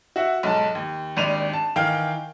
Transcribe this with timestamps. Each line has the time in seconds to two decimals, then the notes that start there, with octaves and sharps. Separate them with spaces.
0.16 F#4 E5 F#5
0.43 B1 G#2 A5
0.75 D#2
1.17 G#1 D#2 D4 D#7 F7
1.53 A5
1.76 D#3 E3 F5 G5